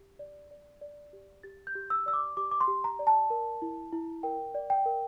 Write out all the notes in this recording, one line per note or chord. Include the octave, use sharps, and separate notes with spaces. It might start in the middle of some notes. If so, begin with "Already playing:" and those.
Already playing: G4
D5
D5
D5
G4
G4 A6
G6
G4
E6
D5 E6
D6
G4 D6
D6
C6
G4
A#5
D5
A5
A#4
E4
E4
A#4 G5
D5
G5
A#4